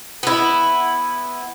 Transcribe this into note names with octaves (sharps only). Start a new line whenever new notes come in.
B3 E4